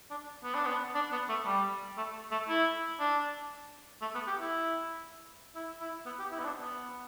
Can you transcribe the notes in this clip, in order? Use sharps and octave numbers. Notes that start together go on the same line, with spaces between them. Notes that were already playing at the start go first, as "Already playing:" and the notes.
D4
B3
D4
B3
D4
B3
A3
G3
A3
A3
E4
D4
A3
B3
G4
E4
E4
E4
B3
G4
E4
B3
D4
B3